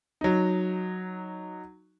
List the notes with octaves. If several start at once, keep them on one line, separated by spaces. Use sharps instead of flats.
F#3 D#4